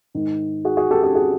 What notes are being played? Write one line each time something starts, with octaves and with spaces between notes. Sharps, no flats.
G#2 D#3
F#4 G#4
F#4 G#4
G4 A4
G4 A4
F#4 G#4